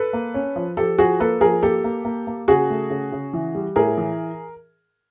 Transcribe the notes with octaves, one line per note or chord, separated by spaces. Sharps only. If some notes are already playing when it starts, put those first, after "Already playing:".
Already playing: A4 B4
A#3
C#4
F3
F3 G4 A4
F3 F#4 G#4
A#3 A4 B4
F3 G#4 A#4
A#3 G4 A4
A#3
A#3
A#3
C#3 F#4 G#4
A3
C#3
C#3
E3
G3
A2 G#4 A#4
E3